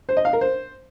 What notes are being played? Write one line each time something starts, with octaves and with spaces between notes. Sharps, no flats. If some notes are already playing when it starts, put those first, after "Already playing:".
C5
D#5
F5
A#4
C5